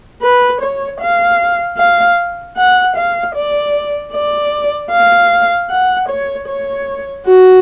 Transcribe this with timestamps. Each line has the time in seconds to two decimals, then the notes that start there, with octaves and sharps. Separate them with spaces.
0.22 B4
0.61 C#5
1.01 F5
1.78 F5
2.57 F#5
2.97 F5
3.36 D5
4.13 D5
4.91 F5
5.70 F#5
6.09 C#5
6.48 C#5
7.27 F#4